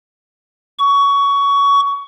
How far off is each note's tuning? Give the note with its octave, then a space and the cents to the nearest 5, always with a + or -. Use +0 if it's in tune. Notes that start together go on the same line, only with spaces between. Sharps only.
C#6 +20